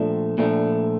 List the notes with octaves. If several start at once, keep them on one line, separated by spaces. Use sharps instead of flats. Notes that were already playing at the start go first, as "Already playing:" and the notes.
Already playing: A#2 F3 A3 D4
A#2 F3 A3 D4